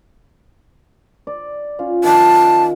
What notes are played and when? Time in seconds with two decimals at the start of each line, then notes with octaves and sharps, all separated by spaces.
1.27 D5
1.79 C#4 F4
2.04 D#3 A5